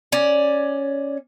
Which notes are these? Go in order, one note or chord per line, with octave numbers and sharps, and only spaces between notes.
C#4 D5